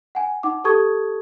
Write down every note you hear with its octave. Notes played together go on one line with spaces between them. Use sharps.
F#5 G#5
D#4 F#5 D6
G4 A4 A5 C#6 D#6 G#6